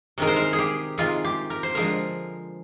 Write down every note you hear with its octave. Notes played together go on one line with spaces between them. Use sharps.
C3 D#3 G#3 A#4
C5
A#4
G#4
G4
C3 D#3 G#3 F4
G4
A#4
C5
D3 F3 G#3 A#4